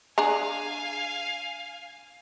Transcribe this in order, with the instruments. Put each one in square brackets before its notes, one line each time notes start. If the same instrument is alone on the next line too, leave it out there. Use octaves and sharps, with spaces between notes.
[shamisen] D4 G#4 A#5 [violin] F5 G#5